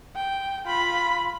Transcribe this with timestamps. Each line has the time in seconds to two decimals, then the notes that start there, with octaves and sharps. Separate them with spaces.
0.16 G5
0.66 F4 B5